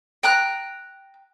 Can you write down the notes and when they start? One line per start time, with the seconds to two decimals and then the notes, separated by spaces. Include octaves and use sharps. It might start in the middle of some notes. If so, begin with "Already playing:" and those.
0.23 G5 A#5 F#6